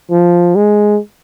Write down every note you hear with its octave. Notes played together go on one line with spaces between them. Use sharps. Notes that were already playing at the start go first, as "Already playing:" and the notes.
F3
G#3